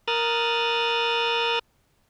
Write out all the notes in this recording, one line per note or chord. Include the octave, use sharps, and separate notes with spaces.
A#4 D#6 F6 F#6 A6